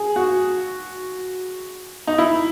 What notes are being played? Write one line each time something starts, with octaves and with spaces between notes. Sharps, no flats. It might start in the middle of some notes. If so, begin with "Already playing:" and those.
Already playing: G#4
F#4
D#4
E4